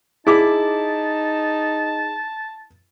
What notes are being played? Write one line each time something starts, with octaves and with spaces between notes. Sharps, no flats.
D#4 E4 G#4 A5 D6